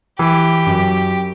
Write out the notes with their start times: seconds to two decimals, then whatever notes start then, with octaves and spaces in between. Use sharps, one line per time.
0.19 E3 G4
0.66 F#2